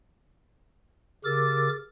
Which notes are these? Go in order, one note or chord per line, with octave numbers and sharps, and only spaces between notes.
C#3 G4 A#4 D6 E6 A6